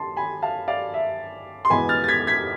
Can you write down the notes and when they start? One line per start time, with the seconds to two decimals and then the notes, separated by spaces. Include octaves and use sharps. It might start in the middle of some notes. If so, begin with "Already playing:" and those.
Already playing: A5 C6
0.16 G#5 B5
0.42 F5 A5
0.68 D5 F5
0.94 E5
1.65 C6
1.70 E2 B2 G#3 B3 G#5 B5
1.89 F6 A6
2.04 A6
2.08 G#6 B6
2.27 G#6 B6